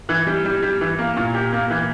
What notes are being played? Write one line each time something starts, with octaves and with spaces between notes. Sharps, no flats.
E3
G3
G3
G3
E3
A#3
A#2
G4
A#3
E3